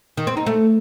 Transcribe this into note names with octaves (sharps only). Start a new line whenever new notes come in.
D#3
C4
D#4
A3